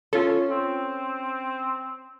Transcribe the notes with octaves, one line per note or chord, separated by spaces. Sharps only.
C#4 F4 A4
C4